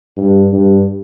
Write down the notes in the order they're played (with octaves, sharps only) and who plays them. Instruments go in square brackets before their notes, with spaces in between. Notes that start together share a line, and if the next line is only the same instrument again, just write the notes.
[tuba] G2
G2